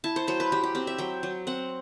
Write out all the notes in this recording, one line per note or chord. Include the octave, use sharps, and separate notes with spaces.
E4 A5
C5
F#3 C5
B4
F#3 G4
G4
C4 G4
E5
F#3 G5
F#3
C4 F#5